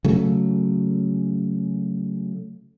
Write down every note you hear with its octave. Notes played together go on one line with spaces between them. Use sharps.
C#3 F#3 A3